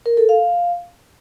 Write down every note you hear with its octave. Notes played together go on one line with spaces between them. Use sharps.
A#4
A4
F5